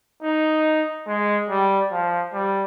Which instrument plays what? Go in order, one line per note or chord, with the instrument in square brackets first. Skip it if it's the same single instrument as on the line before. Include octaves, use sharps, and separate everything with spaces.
[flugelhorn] D#4
G#3
G3
F3
G3